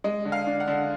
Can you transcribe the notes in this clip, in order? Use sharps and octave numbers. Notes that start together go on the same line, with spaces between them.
G#3 D#5
D3
F5
D4
F#5
D3